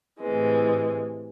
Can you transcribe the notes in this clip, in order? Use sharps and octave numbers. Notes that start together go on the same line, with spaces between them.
A2 C3 E3 G#3